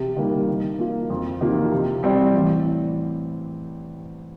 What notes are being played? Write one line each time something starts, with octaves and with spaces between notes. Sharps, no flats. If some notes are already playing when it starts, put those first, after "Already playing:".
Already playing: C3
D#3 G3 A#3
D#3
A#3 F4
F2
C3 D#3 A#3 F4
C3
G3 C4 G4 D5
A1